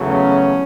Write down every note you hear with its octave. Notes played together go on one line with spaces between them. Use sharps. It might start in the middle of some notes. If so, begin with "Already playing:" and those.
Already playing: E2 C#3 F#3 A3
C#4